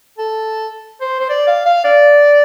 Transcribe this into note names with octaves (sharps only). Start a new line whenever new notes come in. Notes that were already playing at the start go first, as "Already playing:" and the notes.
A4
C5
C5
D5
F5
F5
D5